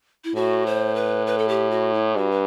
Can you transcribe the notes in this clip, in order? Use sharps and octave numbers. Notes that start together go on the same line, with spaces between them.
E4
A2 F#4
C5
B4
B4
A4
G4
F#4
E4
G2 F#4
B4